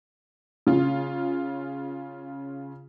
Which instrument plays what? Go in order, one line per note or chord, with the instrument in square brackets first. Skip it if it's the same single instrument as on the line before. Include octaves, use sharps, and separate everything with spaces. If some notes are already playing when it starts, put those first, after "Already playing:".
[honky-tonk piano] C#3 F4